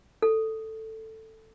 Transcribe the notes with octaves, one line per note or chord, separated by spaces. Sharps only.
A4